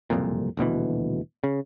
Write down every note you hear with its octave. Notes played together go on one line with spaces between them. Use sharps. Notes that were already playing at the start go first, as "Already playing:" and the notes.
F#1 C2 F2 A#2
D#1 D2 B2 E3
C#3